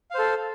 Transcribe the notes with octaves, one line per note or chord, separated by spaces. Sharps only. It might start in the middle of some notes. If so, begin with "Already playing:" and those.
A4 C5 F5